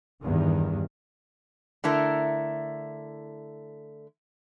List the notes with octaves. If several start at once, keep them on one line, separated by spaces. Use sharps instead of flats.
E2 G2 D#3
D3 A3 E4 A#4